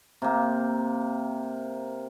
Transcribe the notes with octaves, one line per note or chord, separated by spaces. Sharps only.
C3 A#3